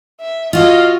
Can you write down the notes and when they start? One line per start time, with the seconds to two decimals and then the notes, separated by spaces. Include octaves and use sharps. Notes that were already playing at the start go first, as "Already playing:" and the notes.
0.21 E5
0.53 F4 F#4 D#5 F5